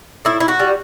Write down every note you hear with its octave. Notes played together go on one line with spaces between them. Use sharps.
A2 E4
E4
F#4
G3